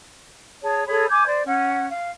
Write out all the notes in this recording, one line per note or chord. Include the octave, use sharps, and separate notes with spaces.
G#4 C#5 A5
G#4 A4 C#5 B5
G#5 D6 G6 G#6
C5 D5
C#4 F#5
F5